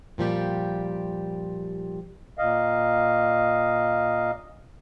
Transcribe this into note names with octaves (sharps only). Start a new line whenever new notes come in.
A#2 F3 G3 G4
A#2 D#5 F5